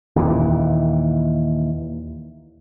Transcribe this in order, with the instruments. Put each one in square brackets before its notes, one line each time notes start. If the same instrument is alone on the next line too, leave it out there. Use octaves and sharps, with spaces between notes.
[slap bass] D#2 A#2 E3